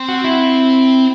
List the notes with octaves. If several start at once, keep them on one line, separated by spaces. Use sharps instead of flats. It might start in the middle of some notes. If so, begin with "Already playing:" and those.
Already playing: C4
F#4
E4